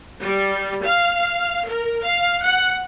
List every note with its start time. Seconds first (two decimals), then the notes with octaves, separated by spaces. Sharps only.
0.22 G3
0.83 F5
1.67 A#4
2.05 F5
2.44 F#5